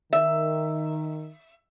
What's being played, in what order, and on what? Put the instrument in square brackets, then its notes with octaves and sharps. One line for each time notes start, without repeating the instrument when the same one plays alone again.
[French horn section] D#3 [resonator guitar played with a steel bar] E5